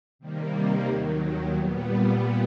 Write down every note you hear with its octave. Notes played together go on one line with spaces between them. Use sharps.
C3 D#3 G3 A#3
D#2 D#3 F#3
A#2 G3 B3